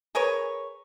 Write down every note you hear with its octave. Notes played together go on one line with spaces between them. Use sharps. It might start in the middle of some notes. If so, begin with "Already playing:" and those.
G#4 A#4 B4 C#5